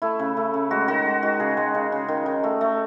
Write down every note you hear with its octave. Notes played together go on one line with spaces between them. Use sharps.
A3 E4
C#3
A3
C#3
G#3 F#4
D#3 F#4
G#3
D#3 F#4
C#3 G#4
G#3
C#3
C#3
D#3
D#3
A3
A3